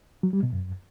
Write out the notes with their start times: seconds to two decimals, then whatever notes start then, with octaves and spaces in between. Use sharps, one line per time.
0.23 F#3
0.33 G3
0.43 B2
0.53 F#2